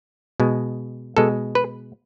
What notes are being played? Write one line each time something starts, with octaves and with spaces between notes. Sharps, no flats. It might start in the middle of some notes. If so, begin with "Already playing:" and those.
B2 G#3
B2 G#3 A4
B4